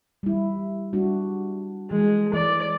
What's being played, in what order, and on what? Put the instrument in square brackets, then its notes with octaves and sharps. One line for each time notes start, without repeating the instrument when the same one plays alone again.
[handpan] G3 E4
G3 D4 F#4
[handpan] E3 [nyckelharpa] G#3
[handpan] E3 D#5 [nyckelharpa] D5